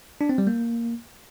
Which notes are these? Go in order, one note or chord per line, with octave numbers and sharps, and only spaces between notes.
D4
C4
G3
A#3